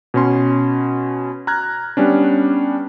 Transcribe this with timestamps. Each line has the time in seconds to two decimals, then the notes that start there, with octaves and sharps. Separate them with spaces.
0.14 B2 C#4 C6
1.47 A#5 F6 F#6 G#6
1.97 G3 B3 C#4 D4